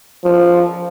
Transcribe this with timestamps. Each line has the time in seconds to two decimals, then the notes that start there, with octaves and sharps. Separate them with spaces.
0.24 F3